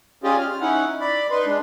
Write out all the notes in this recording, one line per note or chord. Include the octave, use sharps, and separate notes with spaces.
C#4 F4 G4 G#4 D5 D#5
F6
C#4 D#4 E4 F#5
D5 B5
D#4 B4 C6
G#3 D4